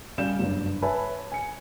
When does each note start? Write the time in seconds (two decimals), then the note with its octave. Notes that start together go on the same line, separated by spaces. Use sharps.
0.18 G3 C#4 D5 F5 G6 E7
0.39 F#1 G2
0.82 B4 C#5 E5 G#5 A5 B5
1.32 G#5 C#7